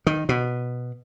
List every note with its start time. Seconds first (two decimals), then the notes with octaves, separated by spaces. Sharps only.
0.07 D#3
0.29 B2